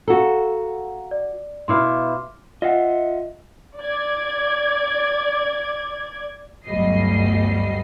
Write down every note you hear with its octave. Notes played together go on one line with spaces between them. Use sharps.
F#4 A4 F5 F#5 A#5
D5
B2 E4 F5 C6 D6 F6
F4 D#5 E5 F#5
D5 G#6
G1 D2 F#3 G3 D#5 C7